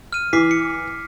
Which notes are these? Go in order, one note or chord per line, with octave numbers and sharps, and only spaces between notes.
F6 D#7
E3 D6 B6 C7
C#7